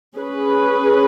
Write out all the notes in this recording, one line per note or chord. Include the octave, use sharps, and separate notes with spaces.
C#4 G#4 B4